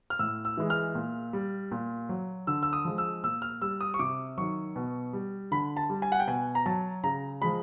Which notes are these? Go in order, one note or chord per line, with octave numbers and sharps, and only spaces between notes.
F6
A2 E6
E6
E3 G#3
F6
A#2
G3
A#2
F#3
D3 E6
E6
D#6
F3 G#3
E6
A#2 E6
F6
G3 E6
D#6
C#6
C3 D6
D#3 F#3 C#6
B2
G3
D3 B5
A5
G3
G#5
F#5
G5
B2 G#5
A#5
F#3 A5
C#3 A#5
F3 G#3 B5